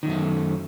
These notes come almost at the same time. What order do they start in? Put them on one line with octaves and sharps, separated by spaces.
D#3 F#2 A3